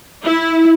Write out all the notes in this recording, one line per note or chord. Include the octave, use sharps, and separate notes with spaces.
E4